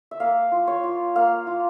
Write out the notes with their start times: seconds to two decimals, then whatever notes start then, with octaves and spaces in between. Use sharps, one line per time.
0.11 E5
0.20 A#3 F5
0.52 F4
0.67 C#5
0.83 F4
1.15 A#3 F5
1.47 F4